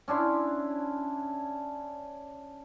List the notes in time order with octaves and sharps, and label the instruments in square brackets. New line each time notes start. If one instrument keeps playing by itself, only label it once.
[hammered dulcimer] C#4 D4 E4 C6